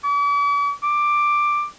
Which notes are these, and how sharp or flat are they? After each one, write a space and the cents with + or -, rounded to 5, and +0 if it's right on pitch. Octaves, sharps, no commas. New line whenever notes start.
D6 -45
D6 +10